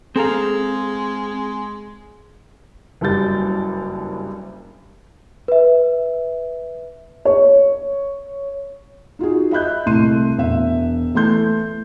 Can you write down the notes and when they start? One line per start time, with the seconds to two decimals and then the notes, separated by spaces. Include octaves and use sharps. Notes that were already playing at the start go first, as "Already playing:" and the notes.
0.16 G#3 C4 G#4 A4 F5 A#5
3.01 F#1 G2 F#3 G3 G6 A6
5.48 B4 E5
7.25 C#5
9.19 D#4 F4 F#4 G#4
9.51 D#5 E5 B5 F#6 G6
9.86 C2 A3 E4 C6 D#7
10.38 E1 E5
11.14 E3 A3 A4 C6 G6